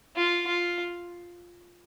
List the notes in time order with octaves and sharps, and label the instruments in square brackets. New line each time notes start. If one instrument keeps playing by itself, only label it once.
[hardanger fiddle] F4
F4